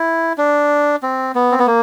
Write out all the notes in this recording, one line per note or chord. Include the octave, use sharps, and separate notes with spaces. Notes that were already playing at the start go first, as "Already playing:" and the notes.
Already playing: E4
D4
C4
B3
C4
B3
A#3